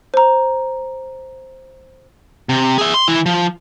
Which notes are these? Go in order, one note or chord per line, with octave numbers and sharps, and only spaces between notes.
C5 A#5
C3
G#4 E5
C6
E3 E4
F3